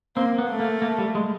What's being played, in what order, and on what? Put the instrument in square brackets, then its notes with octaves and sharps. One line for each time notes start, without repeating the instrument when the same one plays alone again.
[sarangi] A#3 [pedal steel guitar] C4
[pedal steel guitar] B3
[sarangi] A3
[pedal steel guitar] A#3
A#3
G3
G#3